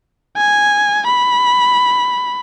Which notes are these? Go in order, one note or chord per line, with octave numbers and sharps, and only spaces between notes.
G#5
B5